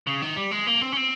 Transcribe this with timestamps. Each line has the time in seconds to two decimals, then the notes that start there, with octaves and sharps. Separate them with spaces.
0.07 C#3
0.22 D#3
0.36 G3
0.51 G#3
0.67 A#3
0.81 C4
0.92 C#4
0.97 C4